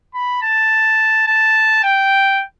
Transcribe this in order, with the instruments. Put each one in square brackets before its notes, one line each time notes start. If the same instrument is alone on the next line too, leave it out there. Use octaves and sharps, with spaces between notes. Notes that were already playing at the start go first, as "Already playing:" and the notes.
[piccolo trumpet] B5
A5
A5
G5